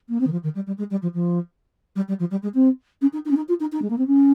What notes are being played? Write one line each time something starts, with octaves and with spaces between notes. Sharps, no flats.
A#3
C4
D#3
F3
D#3
G3
G3
G#3
G3
F3
F3
G3
G3
F3
G3
G#3
C4
C#4
D#4
D#4
C#4
D#4
F4
D#4
D#4
G#3
A#3
C4
C#4